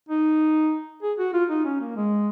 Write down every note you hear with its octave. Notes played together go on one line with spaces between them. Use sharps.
D#4
G#4
F#4
F4
D#4
C#4
A#3
G#3